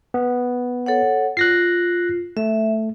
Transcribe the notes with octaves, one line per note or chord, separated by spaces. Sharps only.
B3
A4 C#5 F#5
F4 F#6 A#6 C7
A3 E5